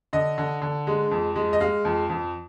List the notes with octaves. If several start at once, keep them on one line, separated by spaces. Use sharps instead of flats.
D3 D#5
D3
D3
G#3
F2
G#3
D#5
G#3 F5
F2
F2